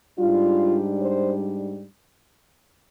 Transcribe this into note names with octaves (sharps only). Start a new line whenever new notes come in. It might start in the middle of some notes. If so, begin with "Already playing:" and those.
G#2 G3 D4 F4
C5